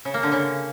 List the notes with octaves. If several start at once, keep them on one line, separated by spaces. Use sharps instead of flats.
C#3
A#3
D3
C#3